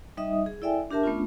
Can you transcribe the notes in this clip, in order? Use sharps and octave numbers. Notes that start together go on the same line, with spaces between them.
G3 D#4 D#5 E5 D#6
G#4
E4 A4 D5 E5 G5 G#5
D4 G4 A#4 E5 A5
A3 B3 C#4 D4 F4